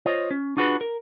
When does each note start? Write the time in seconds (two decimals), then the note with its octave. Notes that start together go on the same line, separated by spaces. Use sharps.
0.06 F4 C5 C#5 D#5
0.31 C#4
0.57 D4 F4 F#4 G#4 B4
0.81 A#4